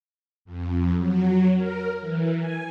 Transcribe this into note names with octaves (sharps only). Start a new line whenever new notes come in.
F2
F#3
A#4
E3
G#5